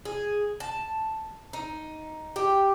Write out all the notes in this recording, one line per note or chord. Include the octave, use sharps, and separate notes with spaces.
G#4
A5
D#4
G4